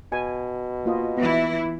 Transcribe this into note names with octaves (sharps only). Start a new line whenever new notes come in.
B2 G#5
A#3 F4 D#5
E3 B3 E4